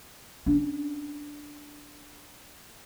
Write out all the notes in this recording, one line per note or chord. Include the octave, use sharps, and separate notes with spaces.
C#4 D4